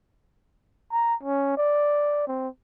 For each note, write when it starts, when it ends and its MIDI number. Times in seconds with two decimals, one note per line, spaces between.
0.92 1.15 82
1.23 1.53 61
1.57 2.23 74
2.28 2.48 60